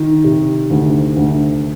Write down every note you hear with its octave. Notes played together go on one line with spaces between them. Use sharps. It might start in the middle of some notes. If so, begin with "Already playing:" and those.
Already playing: D#3
C3
D2
D2